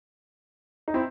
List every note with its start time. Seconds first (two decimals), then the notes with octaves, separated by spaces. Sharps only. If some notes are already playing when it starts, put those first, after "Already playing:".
0.88 D#4
0.94 C4 E4